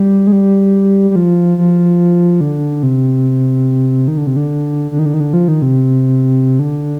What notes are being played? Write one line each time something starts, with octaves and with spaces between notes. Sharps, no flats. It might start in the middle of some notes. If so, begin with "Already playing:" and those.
Already playing: G3
G#3
G3
G3
F3
F3
D3
C3
D#3
D3
C3
D3
D3
D#3
D3
D#3
D3
F3
D#3
C3
D3